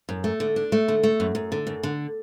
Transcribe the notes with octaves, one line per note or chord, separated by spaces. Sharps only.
F#2
A3
D3
D4
A3
D3
A3
F#2
F#2
D3
F#2
D3